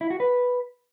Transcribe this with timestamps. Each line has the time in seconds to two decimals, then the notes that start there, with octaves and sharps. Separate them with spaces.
0.01 E4
0.10 F#4
0.20 B4